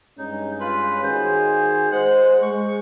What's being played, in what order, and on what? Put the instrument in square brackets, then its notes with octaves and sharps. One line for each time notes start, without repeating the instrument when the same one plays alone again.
[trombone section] G2 G#3 C#4 [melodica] D#4
[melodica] F4 B4
[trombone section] D#3 F#4 G#4 [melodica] C5
[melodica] G#3 F#5 [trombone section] C5
[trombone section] G#3 [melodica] C#6